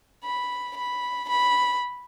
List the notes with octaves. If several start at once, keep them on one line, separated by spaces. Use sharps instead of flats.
B5
B5
B5